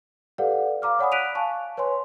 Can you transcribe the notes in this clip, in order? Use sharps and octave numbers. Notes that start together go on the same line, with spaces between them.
G4 A4 B4 D5 F5 F#5
F5 A#5 D6 F6
C#5 D5 F#5 G#5 B5 D#6
F#6 B6 D7 D#7 F7
F5 G#5 A5 C#6
B4 C#5 G#5 C6